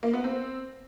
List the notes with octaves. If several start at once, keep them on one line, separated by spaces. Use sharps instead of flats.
A#3
B3
C4